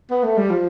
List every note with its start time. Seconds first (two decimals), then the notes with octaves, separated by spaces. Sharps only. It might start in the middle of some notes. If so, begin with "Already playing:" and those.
0.11 B3
0.24 A3
0.38 G3
0.50 F3